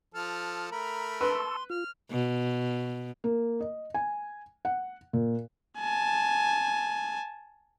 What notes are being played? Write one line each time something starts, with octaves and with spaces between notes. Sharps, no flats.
F3 A4 F6
A3 A#4 A#5 B5
B4 A5 C6 C#6 E6
F4 F6
B2
A#3
D#5
G#5
F#5
A#2
G#5 A5